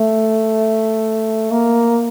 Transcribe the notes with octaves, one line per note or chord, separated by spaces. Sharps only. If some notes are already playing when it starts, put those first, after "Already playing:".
Already playing: A3
A#3